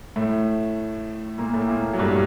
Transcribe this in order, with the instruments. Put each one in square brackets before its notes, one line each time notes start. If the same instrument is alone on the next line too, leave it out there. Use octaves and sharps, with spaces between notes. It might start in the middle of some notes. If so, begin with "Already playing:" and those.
[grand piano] A2 A3
A#2 A#3
A2 A3
A#2 A#3
F#3
G2 G3